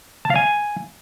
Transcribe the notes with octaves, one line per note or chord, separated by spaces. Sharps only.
A5
F5
G#5